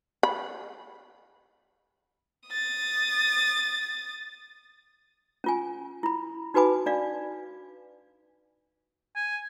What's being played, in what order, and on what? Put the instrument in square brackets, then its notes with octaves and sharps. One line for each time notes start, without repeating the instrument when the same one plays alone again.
[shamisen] B5
[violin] D#6 A6
[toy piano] C#4 F4 G#5
E4 B5
D#4 F#4 B4 G#5 B5 D6
D4 D5 F5
[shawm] G#5